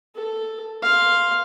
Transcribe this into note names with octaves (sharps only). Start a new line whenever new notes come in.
A4
F5 C6